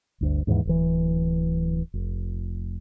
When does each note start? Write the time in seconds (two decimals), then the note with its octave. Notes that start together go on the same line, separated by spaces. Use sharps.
0.21 G1 D2
0.47 D#2 G#2 C3 E3
0.65 D1 E3
1.93 F1